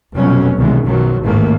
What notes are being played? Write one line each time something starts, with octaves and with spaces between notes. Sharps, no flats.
F1 F2 B2 F#3 G3 C#4
C2 F#2 B2 D#3 E3 G#3
B1 D#3 F3 F#3
A1 D#2 G#2 D#3 A3 A#3